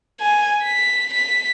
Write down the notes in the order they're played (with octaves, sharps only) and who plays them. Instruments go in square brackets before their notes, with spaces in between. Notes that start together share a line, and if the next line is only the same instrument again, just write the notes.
[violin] G#5
B6
B6